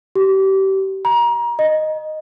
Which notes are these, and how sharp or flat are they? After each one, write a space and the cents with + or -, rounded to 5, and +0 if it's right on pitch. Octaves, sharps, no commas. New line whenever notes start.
G4 -30
A#5 +30
D#5 -5